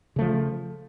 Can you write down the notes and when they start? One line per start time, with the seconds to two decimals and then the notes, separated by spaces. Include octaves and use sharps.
0.16 C#3
0.19 A3
0.21 F3